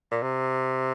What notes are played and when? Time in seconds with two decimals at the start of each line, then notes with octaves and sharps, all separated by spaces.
0.12 A#2
0.22 C3